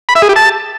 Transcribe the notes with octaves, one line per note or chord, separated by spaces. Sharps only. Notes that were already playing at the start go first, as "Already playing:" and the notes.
B5
E5
G#4
G4
A5